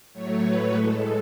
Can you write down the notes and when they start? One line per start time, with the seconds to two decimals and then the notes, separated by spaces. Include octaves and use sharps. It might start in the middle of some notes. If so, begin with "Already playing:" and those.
0.13 A2 F#3 A3 C#5
0.43 B4
0.73 A2 G#3 A4